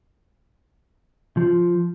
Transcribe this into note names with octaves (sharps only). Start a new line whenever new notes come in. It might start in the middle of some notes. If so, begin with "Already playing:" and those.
F3